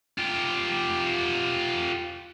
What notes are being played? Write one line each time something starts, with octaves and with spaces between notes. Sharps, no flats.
F4 G4